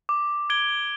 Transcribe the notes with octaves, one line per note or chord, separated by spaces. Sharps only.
D6
G#6 D7 G7